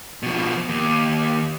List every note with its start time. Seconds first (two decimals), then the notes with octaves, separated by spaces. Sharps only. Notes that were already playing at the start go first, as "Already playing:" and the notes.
0.23 B2 F3
0.69 D#2